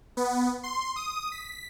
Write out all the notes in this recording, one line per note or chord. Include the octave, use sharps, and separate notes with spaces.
B3
C6
D#6
B6